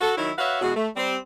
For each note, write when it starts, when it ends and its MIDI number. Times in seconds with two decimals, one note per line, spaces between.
0.01 0.17 66
0.01 0.17 69
0.17 0.32 51
0.17 0.32 54
0.17 0.32 64
0.38 0.59 66
0.38 0.59 71
0.38 0.59 73
0.38 0.59 76
0.38 0.59 77
0.61 0.74 47
0.61 0.74 52
0.61 0.74 56
0.61 0.74 66
0.76 0.88 57
0.96 1.17 55
0.96 1.17 60